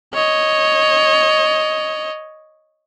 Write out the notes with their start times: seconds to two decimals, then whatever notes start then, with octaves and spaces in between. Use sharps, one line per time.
0.14 C#5 D#5